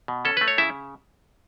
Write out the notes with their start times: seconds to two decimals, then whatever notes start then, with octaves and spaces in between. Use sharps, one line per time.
0.08 B2
0.25 C#4 A4
0.37 A3 B4
0.48 C#5
0.58 C#3 E4 E5